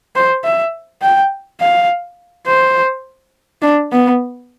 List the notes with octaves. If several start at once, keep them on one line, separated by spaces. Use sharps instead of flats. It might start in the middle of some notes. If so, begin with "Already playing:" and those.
C5
E5
G5
F5
C5
D4
B3